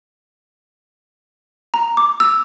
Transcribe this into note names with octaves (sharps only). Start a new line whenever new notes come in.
A#5
D6
E6